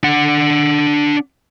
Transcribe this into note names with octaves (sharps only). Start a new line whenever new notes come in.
D4 F#5